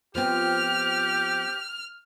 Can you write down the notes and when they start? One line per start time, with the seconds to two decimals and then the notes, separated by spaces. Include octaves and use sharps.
0.15 F3 B3 C4 G4 F6